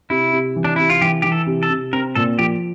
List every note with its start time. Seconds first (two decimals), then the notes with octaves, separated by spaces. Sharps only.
0.10 C3 E4
0.32 C3
0.56 E3
0.64 D4
0.76 C3 E4
0.90 F4
1.01 E3 G4
1.22 E3 G4
1.32 A4
1.46 C3
1.63 A4
1.70 C3
1.93 C4 A#4
2.15 A#2 A4
2.38 F3 G4